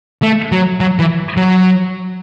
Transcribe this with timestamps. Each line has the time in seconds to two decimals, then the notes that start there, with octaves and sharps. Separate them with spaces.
0.22 A3
0.52 F#3
0.80 F#3
0.99 E3
1.37 F#3